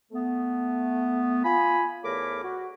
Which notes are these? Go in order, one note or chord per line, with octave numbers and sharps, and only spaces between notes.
A3 B3
F4 G#5 B5
E2 A3 A#4 C#5 B5 D6
F#4